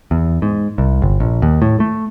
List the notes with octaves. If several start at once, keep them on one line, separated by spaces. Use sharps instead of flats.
E2
G#2
C2
G1
A#1
D#2
A2
A3